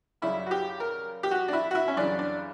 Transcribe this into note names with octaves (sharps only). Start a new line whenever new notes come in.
F#2 C#3 G3 E4
F#4
G4
A#4
G4
F#4
D4
E4
F#4
E4
C#4
F#2 C#3 E3 G3 D4
D4